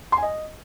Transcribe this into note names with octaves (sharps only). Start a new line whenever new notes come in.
C6
G#5
D#5